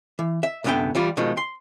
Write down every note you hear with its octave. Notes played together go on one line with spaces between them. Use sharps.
E3
E5
C2 F#2 D3 B3 E4 G5
E3 G3 F4
B2 D#3 F3 G#3
C6